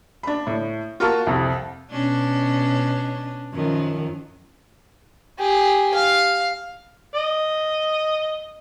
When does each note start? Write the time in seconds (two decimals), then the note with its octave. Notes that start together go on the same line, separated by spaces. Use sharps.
0.23 D4 B5
0.47 A2
1.00 F4 F#4 A#4 A5 C#6 F6
1.27 C2 F2
1.91 B2 C#4 D4
3.53 F#2 D#3 F3
5.39 G4 G#4
5.94 F5
7.15 D#5